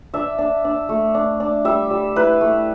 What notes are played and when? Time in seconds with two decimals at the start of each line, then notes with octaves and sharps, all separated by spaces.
0.14 D4 E5
0.38 D4
0.65 D4
0.89 A3
1.14 D4
1.40 D4
1.65 G3 E5
1.91 G3
2.16 E4 B4
2.41 A3